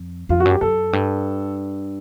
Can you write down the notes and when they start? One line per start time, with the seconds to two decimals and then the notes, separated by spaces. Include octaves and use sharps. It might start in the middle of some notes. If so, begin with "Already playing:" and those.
Already playing: F2
0.29 F2 F4
0.40 F#4
0.45 F#2 G4
0.61 F#2 A4
0.93 G2